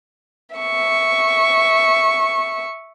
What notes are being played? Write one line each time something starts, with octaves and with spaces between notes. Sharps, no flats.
E5 C#6